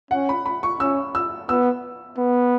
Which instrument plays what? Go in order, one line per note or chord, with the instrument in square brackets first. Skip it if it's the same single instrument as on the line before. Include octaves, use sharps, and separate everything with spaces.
[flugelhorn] C#4 [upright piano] F#5
[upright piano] B5
B5
C#6
[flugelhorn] C#4 [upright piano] E6
[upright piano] E6
[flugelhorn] B3 [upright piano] E6
[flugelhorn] B3